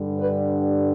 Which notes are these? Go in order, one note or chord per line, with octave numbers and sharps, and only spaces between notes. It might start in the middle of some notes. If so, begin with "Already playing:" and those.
Already playing: G2 D3 G3
B4